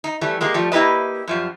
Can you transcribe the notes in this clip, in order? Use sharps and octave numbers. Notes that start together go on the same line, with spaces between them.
D#4
E3 G3 A3
G#3 A#3 G4
F3 G3 A3
A#3 E4 G4 B4 D#5
F#2 F3 G3